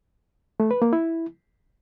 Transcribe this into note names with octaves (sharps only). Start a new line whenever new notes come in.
A3
B4
A#3
E4